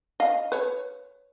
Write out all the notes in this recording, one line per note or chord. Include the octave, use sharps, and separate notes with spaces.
D#5 F5
B4 C#5